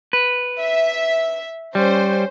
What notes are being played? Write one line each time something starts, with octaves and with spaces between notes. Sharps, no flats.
B4
E5
G3 C#4 C5